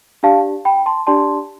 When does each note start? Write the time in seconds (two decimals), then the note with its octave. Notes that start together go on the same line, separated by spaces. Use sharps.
0.23 D4 G4 D5 F5 A5
0.65 G5 B5
0.86 A5 C6
1.07 D4 G4 D5 A5 C6